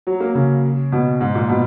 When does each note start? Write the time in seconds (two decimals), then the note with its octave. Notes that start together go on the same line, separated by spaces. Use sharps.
0.07 F#3
0.20 A#3
0.35 C#3
0.92 B2
1.21 G#2
1.35 A#2
1.49 B2